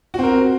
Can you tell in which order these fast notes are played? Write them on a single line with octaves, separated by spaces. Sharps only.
F#4 C4 A#4